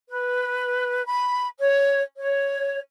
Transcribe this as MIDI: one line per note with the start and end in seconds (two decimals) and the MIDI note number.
0.10 1.05 71
1.06 1.47 83
1.59 2.01 73
2.18 2.80 73